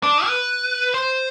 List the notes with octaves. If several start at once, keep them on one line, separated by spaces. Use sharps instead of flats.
D4
B4
C5